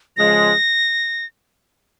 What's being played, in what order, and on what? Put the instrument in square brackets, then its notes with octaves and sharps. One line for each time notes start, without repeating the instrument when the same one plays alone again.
[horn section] C#3 F3 G#3 [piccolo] A#6